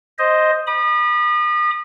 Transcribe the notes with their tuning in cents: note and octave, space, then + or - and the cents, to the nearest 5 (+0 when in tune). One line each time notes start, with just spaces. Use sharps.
C5 +0 D#5 +0
B5 -30 D#6 -40